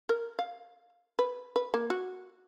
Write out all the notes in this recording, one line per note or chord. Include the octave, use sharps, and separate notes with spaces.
A#4
F5
B4
B4
A#3
F#4